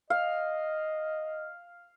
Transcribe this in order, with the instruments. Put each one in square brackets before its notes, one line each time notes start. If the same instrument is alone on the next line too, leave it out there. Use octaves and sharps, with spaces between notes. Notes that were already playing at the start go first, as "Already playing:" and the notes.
[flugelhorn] D#5 [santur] F5